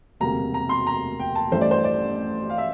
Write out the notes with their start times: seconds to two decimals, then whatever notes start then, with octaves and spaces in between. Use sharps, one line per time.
0.20 E1 D2 C3 G3 A#3 A#5
0.54 A#5
0.69 C6
0.87 A#5
1.20 G5
1.35 A5
1.51 A1 G2 E3 A3 C5
1.61 D5
1.71 C5
1.84 D5
2.50 F5
2.58 E5